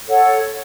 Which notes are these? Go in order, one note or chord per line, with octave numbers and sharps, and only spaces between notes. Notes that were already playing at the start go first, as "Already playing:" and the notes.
A4 C#5 F#5